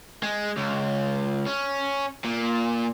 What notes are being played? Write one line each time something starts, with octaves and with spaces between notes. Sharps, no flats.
G#3
C#2
C#4
A#2